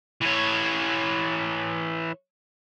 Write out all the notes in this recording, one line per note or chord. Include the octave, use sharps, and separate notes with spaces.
E3 C#5